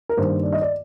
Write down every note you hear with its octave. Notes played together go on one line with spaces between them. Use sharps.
A#4
G2 D#3 A#3 C5
D5
D#5
D5